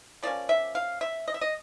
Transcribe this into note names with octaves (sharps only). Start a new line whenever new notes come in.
F3 A#3 C#4 D5
E5
F5
E5
D#5
E5
D#5